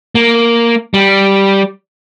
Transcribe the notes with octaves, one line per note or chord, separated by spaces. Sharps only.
A#3
G3